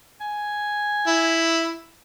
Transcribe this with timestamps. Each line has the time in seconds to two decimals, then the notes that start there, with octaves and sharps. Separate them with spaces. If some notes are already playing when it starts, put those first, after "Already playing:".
0.21 G#5
1.07 E4